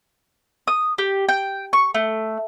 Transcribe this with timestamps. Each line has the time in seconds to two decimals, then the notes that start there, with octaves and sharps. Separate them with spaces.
0.67 D#6
0.98 G4
1.29 G5
1.73 C#6
1.94 A3